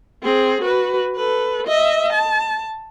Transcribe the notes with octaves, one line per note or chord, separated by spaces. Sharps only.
C4 G#4
F#4 B4
A4 B4
D#5 E5
A5